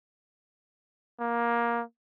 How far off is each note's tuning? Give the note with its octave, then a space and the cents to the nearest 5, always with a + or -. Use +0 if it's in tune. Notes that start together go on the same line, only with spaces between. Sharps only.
A#3 +15